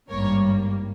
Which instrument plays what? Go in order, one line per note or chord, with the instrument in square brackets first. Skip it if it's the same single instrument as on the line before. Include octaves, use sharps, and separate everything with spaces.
[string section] G#1 G2 G3 A#3 A#4 C#5